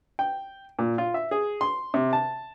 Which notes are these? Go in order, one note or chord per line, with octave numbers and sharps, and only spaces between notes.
G5
A#2
F4
E5
G#4
C6
C3
A5